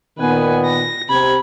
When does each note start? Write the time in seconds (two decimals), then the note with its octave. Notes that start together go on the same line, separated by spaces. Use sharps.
0.18 A#2 D#3 B3 B4 G#5
0.66 A#6
1.09 C3 B5 G#6